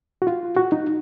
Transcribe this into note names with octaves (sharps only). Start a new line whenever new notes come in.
F#4
F4
F#4
D#4